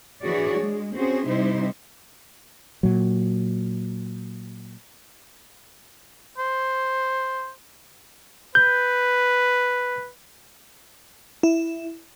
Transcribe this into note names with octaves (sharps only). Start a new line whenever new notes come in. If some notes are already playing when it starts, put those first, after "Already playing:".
E3 D4 F#4 G#4 C#5 D5
G#3
C4 C#4 F#4 G#4 C5
C3 G3 D#4 E4 C5
A#2 F#3
C5
B4 G6
E4